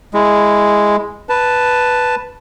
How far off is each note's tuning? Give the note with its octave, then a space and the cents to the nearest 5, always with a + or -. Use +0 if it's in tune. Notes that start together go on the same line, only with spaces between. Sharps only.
G#3 +0 E4 +0
B4 +0 A5 +0